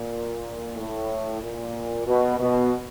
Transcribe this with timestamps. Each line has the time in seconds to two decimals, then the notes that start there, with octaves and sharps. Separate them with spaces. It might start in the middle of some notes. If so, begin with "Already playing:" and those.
Already playing: A#2
0.77 A2
1.42 A#2
2.06 B2
2.39 B2